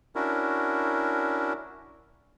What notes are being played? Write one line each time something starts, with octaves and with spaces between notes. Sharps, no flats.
C#4 D4 E4 F#4 A#4